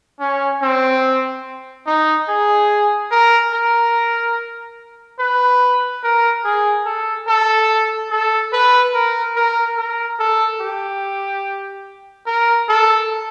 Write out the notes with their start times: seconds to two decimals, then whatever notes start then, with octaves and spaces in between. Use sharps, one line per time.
0.20 C#4
0.62 C4
1.86 D#4
2.28 G#4
3.11 A#4
3.53 A#4
5.19 B4
6.03 A#4
6.44 G#4
6.85 A4
7.28 A4
8.11 A4
8.53 B4
8.94 A#4
9.36 A#4
9.77 A#4
10.19 A4
10.61 G4
12.26 A#4
12.69 A4